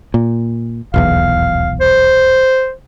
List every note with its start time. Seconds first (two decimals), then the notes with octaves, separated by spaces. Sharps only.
0.14 A#2
0.94 D#1 B1 E2 F5
1.81 C5